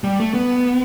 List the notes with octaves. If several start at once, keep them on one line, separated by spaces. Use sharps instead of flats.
G3
A3
B3